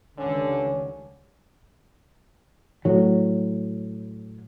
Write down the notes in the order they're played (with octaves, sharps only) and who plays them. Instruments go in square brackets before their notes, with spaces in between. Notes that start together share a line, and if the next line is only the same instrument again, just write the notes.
[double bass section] C#2 D#3 G3 [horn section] D3 [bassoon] C#4
[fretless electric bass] A2 F#3